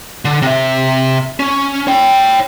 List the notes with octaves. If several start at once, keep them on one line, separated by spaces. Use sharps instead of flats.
D3
C3 E5
C#4
C#5 G5